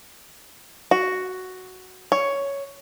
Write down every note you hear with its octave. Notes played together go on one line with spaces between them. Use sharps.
F#4
C#5